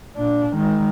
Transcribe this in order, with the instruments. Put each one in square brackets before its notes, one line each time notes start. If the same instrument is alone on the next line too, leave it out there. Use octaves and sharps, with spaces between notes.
[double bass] A#2 D4
D#3 G#3